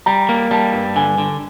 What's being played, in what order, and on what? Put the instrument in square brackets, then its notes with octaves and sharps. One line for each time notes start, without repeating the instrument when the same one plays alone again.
[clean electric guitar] G3 [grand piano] A#5
[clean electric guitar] A#3
[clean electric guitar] G3 [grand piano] A5
[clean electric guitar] G2
[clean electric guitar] D3 [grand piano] G#5
[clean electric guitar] D3